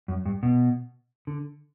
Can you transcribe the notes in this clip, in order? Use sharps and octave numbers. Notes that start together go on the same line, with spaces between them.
F#2
G2
B2
D3